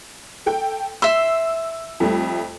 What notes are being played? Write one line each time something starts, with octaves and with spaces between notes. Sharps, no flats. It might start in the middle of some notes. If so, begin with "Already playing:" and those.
A4 G5
E5 C6 E6
F2 G3 A3